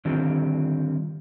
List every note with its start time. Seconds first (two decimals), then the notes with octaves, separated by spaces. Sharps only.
0.05 D3 D#3 G3 C4 F4